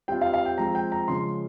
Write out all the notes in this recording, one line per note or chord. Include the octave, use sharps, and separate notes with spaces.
G3 C4 F4 G5
F5
F5
G5
F3 G#3 C4 F4 A#5
G5
A#5
C#3 F3 G#3 C#4 C6